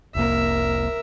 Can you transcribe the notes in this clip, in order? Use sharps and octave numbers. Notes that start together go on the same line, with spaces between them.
F1 C2 A#3 A#4 E5